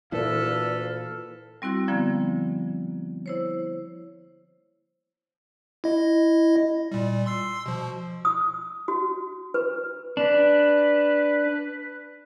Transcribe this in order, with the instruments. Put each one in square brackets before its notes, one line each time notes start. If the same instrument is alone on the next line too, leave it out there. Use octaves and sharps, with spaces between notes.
[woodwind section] D2 B4 F5 [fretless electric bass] A#2 E3 [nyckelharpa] A4
[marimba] G3 C4 E4 F#4
D3 F3 A#3 B3
E4 C5 C#5
[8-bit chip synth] E4 D#5
A#2 G3
C6 E6 C7
B2 F3
[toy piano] D#6
F#4
B4
[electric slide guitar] D4 [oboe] B4